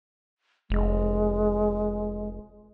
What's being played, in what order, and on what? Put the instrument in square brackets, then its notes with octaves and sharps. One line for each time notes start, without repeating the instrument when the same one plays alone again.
[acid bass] F1 [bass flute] G#3